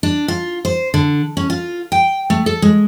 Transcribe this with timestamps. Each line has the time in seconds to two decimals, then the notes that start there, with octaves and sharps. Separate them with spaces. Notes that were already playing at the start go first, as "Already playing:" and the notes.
0.03 D4
0.28 F4
0.65 C5
0.94 D3
1.37 C#4
1.50 F4
1.92 G5
2.30 A3
2.46 A4
2.62 G#3